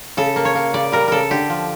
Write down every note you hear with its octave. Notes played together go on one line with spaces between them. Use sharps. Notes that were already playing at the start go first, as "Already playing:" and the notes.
C#3 A4
A#3
C#5
A#3
C#3 D5
G3 A#4
C#3 A4 A#4
D3 G4
F3